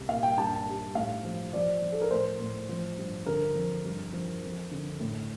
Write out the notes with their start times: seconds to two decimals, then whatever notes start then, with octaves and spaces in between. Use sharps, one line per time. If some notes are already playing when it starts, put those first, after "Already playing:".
Already playing: C2
0.09 A#2 F5
0.23 G5
0.37 G2 A5
0.67 G3
0.95 A2 F5
1.24 F3
1.53 F3 D5
1.82 F3
1.92 A4
2.01 A#4
2.11 A2 C5
2.40 A2
2.69 F3
2.98 G2
3.26 D3 A#4
3.55 F2
3.85 G2
4.13 F3
4.42 F2
4.71 D3
5.00 A2